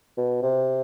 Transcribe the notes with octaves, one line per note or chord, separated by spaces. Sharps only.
B2
C3